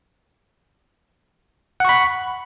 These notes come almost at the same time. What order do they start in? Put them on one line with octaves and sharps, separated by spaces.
F#5 C#6 B5